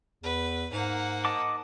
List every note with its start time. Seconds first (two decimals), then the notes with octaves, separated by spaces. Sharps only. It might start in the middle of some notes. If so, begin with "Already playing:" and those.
0.23 E2 B4
0.72 G#2 A#3 F#5
1.25 D#5 A5 D6